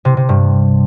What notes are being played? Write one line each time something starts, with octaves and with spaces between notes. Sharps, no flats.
C3
C3
G2